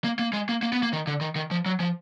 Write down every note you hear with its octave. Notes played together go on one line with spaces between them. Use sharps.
A#3
A#3
G#3
A#3
A#3
B3
A#3
D#3
D3
D#3
D#3
F3
F#3
F3